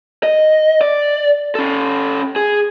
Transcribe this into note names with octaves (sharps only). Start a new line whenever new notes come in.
D#5
D5
C#4 A4
G#4